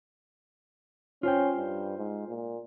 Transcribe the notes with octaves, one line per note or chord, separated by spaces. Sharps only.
C#4 F4 C5 G5
G2
G#2
A#2